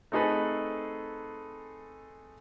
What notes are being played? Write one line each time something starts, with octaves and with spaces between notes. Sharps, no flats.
A3 C4 D#4 G#4 A4 B4